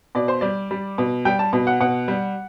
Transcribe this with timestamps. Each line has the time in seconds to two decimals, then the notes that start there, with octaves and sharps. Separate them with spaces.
0.15 B2 D5
0.28 C5
0.41 G3 D5
0.71 G3
0.98 B2
1.25 G3 G5
1.39 A5
1.53 B2
1.67 F#5
1.81 B2 F#5
2.08 G3